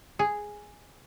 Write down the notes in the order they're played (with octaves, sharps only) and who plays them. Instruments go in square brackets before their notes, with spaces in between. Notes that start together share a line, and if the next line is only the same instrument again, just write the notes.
[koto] G#4